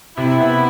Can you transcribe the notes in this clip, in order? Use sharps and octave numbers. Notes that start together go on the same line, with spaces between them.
C3 E4
B3